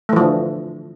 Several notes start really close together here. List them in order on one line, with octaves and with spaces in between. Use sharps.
A3 E3 F3 D3